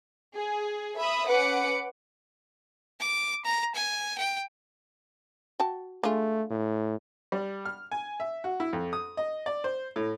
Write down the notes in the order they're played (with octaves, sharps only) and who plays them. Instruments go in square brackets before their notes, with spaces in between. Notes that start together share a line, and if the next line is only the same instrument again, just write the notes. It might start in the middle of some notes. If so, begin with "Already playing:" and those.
[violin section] G#4
E5 B5 D#6
C#4 B4 F#5 D6 C#7
[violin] D6
A#5
G#5
G5
[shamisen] F#4 G5 A5
[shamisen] G#3 D4 F4 [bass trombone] A3
[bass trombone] A2
[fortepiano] G3
F6
G#5
E5
F#4
E4
F2
D#6
D#5
D5
C5
A2